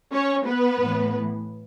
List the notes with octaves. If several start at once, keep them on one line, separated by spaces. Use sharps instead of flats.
C#4 C#5
B3 B4
A2 E3